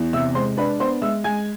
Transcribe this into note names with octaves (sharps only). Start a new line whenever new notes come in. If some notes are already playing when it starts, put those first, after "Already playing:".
Already playing: E2
C3 E5 E6
G#3 C5 C6
D4 B4 B5
B3 C5 C6
G#3 E5 E6
G#3 G#5 G#6